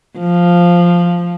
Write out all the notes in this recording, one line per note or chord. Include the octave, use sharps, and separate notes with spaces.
F3